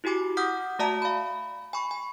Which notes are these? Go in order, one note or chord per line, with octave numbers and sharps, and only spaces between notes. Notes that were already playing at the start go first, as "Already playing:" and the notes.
E4 F#4 G4 G#5 D6
F#5 D6 D#6 F6 G6 B6
A3 F#4 D5 E5 A5 A#5
F5 B5
G#5 B5 C#6
G#5